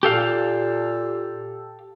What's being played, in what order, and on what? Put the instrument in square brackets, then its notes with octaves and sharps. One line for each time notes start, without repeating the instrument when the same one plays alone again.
[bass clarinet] A#2 [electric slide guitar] G4 A4 F5